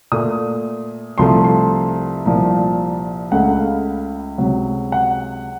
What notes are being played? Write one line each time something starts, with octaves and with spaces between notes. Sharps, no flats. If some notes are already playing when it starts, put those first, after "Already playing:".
A#2 A3 D#6
C2 C3 F3 A3 C6
C6
C2 A#2 F3
C#2 C#3 A3 F#5
F5
C#2 C3 F#3
F#5